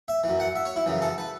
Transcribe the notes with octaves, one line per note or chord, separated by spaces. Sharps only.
E5
F#2 E3
F#5
E5
C#5
E4
F#2 C#3 E3
A4
B4